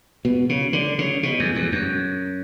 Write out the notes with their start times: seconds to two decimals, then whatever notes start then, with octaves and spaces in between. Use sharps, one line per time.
0.25 B2
0.49 C#3
0.73 D3
0.99 C#3
1.23 B2
1.39 E2
1.55 E2
1.72 F#2